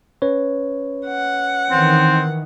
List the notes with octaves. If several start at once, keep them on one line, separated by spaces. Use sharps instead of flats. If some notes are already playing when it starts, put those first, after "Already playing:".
C#4 B4 C#5
F#5
D#3 E3 C4